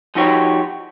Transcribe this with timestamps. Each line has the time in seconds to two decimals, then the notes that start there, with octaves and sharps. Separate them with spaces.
0.15 F3 D#4 F#4 G4 C#5